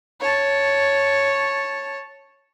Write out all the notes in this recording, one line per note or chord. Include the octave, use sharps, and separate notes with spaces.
C#5 A5